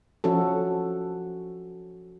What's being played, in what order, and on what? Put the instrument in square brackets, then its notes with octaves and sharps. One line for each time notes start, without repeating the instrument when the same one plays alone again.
[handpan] F3 C#4 F#4 A4